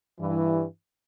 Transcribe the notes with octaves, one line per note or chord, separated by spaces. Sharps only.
G2 E3